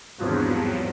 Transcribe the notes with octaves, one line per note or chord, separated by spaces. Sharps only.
G#1 E2 G2 F3 F#3